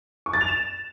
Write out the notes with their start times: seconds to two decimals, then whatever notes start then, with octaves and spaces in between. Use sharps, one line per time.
0.26 C#6
0.33 A6
0.41 F7
0.48 E7